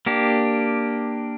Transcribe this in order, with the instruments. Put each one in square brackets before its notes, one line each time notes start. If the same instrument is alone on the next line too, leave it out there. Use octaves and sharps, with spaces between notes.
[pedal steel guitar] A#3 D4 G4